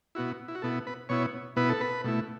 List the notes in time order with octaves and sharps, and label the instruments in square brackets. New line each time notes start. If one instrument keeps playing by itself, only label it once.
[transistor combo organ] B2 B3 E4 F#4
E4
F#4
B2 B3 E4 A4
B4
B2 B3 E4 C#5
B2 B3 E4 B4
A4
B4
B2 A3 E4